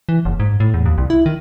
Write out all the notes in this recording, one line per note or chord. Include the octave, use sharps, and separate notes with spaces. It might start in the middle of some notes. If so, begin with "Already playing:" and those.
E3
F#1
G#2
A2
E2
D#2
C2
E4
D#3